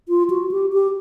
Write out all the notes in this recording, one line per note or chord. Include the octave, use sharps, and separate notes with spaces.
F4
F#4
G4
G4